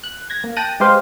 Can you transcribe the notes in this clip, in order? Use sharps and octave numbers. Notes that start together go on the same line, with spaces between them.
F#6
G#6 A#6
A#3
G5 A5 F#6 A#6 D#7
G#3 G4 B4 C5 F5